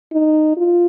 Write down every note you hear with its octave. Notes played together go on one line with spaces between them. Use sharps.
D#4
F4